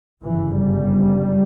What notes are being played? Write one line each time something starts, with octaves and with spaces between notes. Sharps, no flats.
G1 F#2 C#3 E3
G3